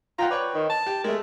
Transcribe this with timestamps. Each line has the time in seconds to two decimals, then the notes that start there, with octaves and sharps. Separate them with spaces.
0.19 F4 F#5 G5 A#5
0.31 B4 C#5 D5 G5
0.54 D#3
0.69 A5
0.86 G4
1.04 G#3 A3 A#4